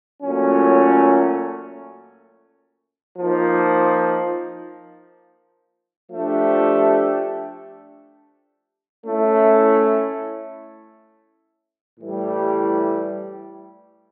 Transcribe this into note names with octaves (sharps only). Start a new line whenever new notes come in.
A#2 F#3 A3 C#4
F3 A#3 D#4
F3 A3 D4 G4
A3 C#4 E4
A2 E3 G3